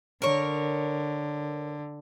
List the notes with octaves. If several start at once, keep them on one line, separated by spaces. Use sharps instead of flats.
D3 A#4 C#5